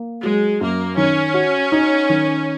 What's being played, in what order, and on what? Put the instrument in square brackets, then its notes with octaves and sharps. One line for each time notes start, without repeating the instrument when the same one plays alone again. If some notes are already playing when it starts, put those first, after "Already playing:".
Already playing: [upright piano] A#3
[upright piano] F#3 [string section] G#3
[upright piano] F#2 [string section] A#3
[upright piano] D#3 [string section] C#4
[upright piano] F#4
D#4
D#3